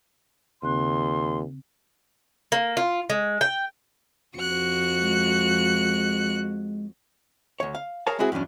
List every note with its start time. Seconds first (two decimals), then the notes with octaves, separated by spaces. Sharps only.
0.62 D#2 C#3 C4 C6 F#6
2.52 A#3
2.77 F4
3.10 G#3
3.41 G5
4.38 F2 F#4 F#6 C#7
5.01 G#3
7.60 D2 C#5
7.75 F5
8.07 G#4 A#4 C#5 F5 G#5 A5
8.19 G#3 C4 E4 F#4 G#4
8.32 E2 G2 F#3 C#4 D4